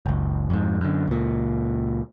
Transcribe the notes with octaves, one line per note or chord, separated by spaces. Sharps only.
F#1 C#2
F2 G#2
F#2 D3
C#2 A#2